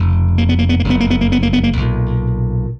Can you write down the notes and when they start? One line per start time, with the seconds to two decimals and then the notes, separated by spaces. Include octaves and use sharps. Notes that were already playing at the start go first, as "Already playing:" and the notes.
Already playing: F1 F2 C#3
0.38 A#3
0.49 B3
0.59 A#3
0.69 B3
0.80 A#3
0.84 F#1 F2 C#3
0.90 B3
1.00 A#3
1.11 B3
1.21 A#3
1.32 B3
1.43 A#3
1.53 B3
1.64 A#3
1.77 B1 A#2